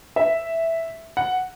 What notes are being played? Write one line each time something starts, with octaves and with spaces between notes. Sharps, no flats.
E5
F#5